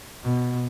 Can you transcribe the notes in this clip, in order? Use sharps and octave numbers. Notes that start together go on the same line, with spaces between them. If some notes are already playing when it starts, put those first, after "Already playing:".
B2